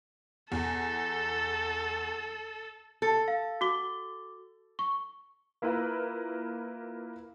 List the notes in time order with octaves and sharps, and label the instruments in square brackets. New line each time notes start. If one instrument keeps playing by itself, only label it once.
[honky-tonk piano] E2 [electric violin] A4
[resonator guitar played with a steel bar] A4
[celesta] F5
F#4 D6 G7
C#6
[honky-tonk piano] A#3 E4 F4 A#4 B4